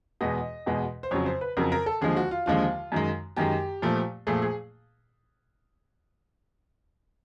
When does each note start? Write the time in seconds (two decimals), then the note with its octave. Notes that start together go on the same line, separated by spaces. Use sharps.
0.21 E2 B2 G#3 D#5
0.66 E2 B2 G#3
1.03 C5
1.11 F2 C#3 F#3 C#5
1.26 C5
1.41 B4
1.57 F2 C#3 F#3 A#4
1.72 A#4
1.86 A4
2.01 D#2 D3 F3 G#3 G#4
2.17 F#4
2.31 F4
2.46 D#2 D3 F3 G#3 F4
2.92 F#2 D#3 G#3
3.37 F#2 D#3 G#3 G4
3.82 A#2 F3 A3
4.27 A#2 F3 A3 G#4
4.42 G#4